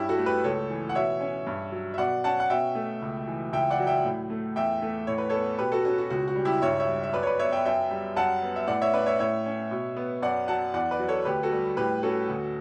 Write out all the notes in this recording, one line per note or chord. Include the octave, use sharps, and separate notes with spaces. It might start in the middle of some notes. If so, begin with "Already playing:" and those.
Already playing: G2 C#4 E4 G4
F#4 A4
A3
G4 B4
C#2 A4 C#5
E3
F#5
B2 C#5 E5
C#4
G2
F#3
E5
B2 D5 F#5
C#4 F#5 A5
F#5
B2 E5 G5
A3
C#2
E3
C#2 E5 G5
D5 F#5
F#3
E5 G5
A2
A3
E2 E5 G5
A3
A2 C#5
B4
B3 A4 C#5
B2 G4 B4
F#4 A4
C#4 F#4
F#4
C#2 F#4
F#4
G3
E4 G4
G2 C#5 E5
C#5 E5
G3
E5
F#2 B4 D5
C#5
B4 D5
B3 C#5 E5
E5 G5
F#2 E5 G5
G3
F#2 F#5 A5
B3
E5
A2 D5 F#5
C#5 E5
C#4 B4 D5
C#5 E5
A2 C#5 E5
C#4
B2
B3
F#2 D5 F#5
F#3 F#5 A5
E2 D5 F#5
B4 D5
F#3
A4 C#5
D2 G4 B4
F#4 A4
G3
A2 G4 B4
C#4 F#4 A4
D2